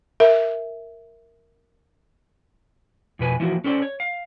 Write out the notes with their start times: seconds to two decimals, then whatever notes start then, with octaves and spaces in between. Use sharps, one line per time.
0.20 A#4 E5
3.19 F2 B2 B4 G#5
3.40 E3 F3 A#3 D#4 F#4
3.64 C#4 A4 C5 D5
3.82 C#5
4.00 F5